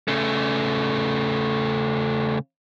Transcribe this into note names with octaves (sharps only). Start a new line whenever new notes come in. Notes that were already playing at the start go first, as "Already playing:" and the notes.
C#3 A3